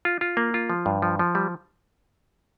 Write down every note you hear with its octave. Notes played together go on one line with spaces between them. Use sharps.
F4
F4
A#3
F4
F3
G2
F3
F3
G3